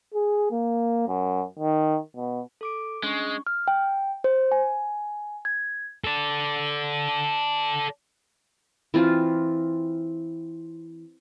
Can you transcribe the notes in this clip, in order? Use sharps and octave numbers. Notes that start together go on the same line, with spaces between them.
G#4
A#3
F#2
D#3
B2
A4 D6 D7
G#3 C#4 D4 C#6
F6
G5
C5
G#5
G#6
A4 D5
E3 C4 F4